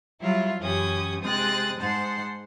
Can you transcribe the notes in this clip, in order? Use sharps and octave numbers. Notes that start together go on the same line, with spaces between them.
F#3 G3 E4 F4
F#2 E3 C#4 G4 D#6 G#6
C3 G#3 C4 D#6 F#6 A6
G#2 G#3 C5 F#5 A5 C6